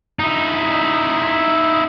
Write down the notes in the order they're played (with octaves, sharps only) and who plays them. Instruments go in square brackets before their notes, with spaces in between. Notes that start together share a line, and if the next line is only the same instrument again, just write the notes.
[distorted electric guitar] D#4 E4